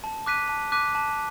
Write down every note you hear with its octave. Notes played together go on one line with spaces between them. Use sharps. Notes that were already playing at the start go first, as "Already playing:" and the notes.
A5
D6 F#6 B6 D#7
A5
D6 F#6 B6 D#7
A5